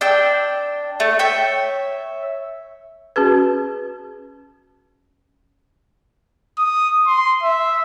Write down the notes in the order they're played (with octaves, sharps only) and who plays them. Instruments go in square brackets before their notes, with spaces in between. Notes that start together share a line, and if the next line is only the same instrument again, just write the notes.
[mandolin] D4 G5 E6
A3
C#5 E5 G5
[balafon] C#4 F#4 G#4 B4
[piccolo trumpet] D#6
C6
E5